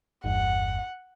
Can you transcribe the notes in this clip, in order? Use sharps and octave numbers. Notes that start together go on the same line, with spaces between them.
G1 E2 G2 F#5